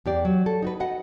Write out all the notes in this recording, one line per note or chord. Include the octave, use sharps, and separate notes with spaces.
E2 G4 D5
F#3
A4
D#4 F#4 B4
F#4 D#5 F#5